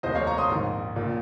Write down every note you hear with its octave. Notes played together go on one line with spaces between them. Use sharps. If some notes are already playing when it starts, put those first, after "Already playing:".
F1 D#2 D#3 C5 D#5
C#5 F5
A#5 C#6
C6 D#6
A#1 G#2 D#3
A#1 A#2